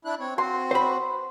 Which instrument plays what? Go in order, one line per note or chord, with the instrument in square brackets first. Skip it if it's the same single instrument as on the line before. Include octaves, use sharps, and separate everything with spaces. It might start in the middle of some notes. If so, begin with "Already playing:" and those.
[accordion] D4 E4 F#6
C4 C#5
[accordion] C4 F#4 [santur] C6
[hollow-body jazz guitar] C5 B5